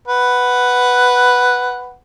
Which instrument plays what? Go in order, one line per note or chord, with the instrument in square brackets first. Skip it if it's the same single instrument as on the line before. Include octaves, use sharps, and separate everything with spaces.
[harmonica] B4 F#5